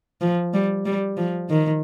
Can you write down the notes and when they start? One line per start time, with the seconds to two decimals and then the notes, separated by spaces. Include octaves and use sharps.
0.21 F3
0.54 G3
0.86 G3
1.17 F3
1.50 D#3